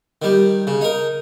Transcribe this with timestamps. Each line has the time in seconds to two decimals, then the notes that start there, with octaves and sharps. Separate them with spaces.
0.22 D#3 G3
0.67 C#3
0.81 D#4 A#4